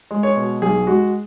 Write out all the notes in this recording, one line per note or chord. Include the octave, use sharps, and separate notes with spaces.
G#3
C#5
B2
B1 G#4
G#3 F#4